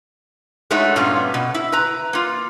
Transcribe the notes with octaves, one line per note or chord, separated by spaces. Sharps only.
G#3 A3 D#4 E4 F#4 C#5
G2 A#2 B3 C#4 F4
B2
E4
B4 A#5
A#3 F4